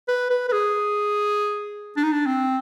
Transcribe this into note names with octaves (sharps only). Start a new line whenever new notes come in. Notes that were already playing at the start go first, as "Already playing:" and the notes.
B4
B4
B4
G#4
D4
D#4
D4
C4